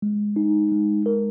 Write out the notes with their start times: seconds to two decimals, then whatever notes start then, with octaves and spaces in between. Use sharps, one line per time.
0.02 G#3
0.36 D#4
0.72 G#3
1.06 A#4